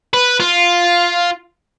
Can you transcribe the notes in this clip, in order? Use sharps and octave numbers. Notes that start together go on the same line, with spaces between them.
B4
F4